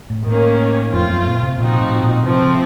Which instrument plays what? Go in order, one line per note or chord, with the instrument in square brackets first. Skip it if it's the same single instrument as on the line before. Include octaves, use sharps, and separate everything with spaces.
[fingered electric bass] A2
[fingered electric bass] A2 [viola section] D#3 A#3 C#4
[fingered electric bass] F2 [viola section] A3 C4 F4
[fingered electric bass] F#2
A#2
C3
[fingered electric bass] A#2 [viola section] F3 C4 D#4 F#4
[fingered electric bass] A2
A#2
[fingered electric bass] C3 [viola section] F3 A3 C4
[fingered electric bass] C#3